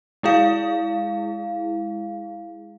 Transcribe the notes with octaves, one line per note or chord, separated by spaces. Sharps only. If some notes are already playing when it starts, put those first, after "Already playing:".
G#3 E4 G#4 F5